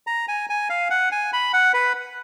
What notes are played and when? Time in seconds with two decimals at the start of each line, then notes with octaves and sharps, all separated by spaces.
0.07 A#5
0.28 G#5
0.50 G#5
0.70 F5
0.90 F#5
1.12 G#5
1.33 B5
1.53 F#5
1.74 B4